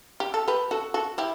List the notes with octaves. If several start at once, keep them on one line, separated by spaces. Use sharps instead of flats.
G4
A4
G4 B4
F#4 A4
F#4 A4
E4 G4